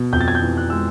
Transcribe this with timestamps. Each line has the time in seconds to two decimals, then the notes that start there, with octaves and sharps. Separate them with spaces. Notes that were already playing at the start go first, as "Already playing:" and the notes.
Already playing: B2
0.13 F2 G6
0.21 A6
0.28 G#6
0.35 G6
0.42 E3
0.57 F#6
0.70 G#3 E6